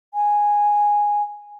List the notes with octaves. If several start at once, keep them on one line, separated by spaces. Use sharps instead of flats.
G#5